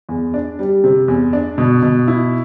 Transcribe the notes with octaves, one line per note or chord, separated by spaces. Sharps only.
E2
D4
G3
C3
E2
D4
B2
B2
E4